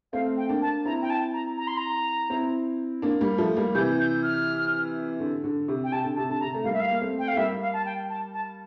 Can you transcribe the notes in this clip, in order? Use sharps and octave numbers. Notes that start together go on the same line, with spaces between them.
A3 C4 F5
G5
A#3 D4
A5
C4 E4 A#5
G5
A5
A#5
A#5
C6
A#5
C4 E4
A#3 D4
G3 A#3
F3 A3
G3 A#3
C3 E3 G6
G6
F6
D3
D3
C3
G5
C3 A5
D3
C3 A5
D3 A5
C3 A#5
A3
G3 A#3 F5
E5
F5
A#3
A3 C4
G5
F5
A3
G3 A#3 E5
F5
A5
G5
A5
A5